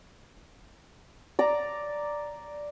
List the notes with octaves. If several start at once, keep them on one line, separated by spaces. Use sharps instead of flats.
D5 A#5